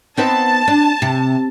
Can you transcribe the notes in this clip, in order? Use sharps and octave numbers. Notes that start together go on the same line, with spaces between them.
B3 C4 D#4 A5
D4
C3